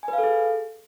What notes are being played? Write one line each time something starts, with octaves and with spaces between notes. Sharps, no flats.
G#5
B4
F5
A4
G#4